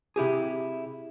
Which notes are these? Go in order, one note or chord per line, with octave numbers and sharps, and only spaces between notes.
C3 E4 G4 G#4